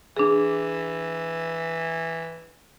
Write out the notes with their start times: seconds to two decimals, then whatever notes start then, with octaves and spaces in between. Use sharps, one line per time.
0.17 E3 D4 G#4